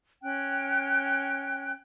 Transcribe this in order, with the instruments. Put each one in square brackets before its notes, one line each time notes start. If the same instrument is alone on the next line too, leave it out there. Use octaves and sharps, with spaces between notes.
[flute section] C#4 G5 F#6